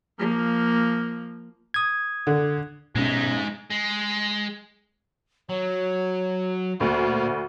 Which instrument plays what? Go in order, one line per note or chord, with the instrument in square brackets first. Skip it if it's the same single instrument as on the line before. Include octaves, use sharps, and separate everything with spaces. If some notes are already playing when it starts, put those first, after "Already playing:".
[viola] F3 A#3
[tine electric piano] D#6 G#6
[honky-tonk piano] D3
[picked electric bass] B2 C4 C#4 [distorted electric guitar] G#3 D#4
[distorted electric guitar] G#3
[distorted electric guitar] F#3 [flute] C#5
[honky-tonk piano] D2 [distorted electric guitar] A#2 A#4 [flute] C5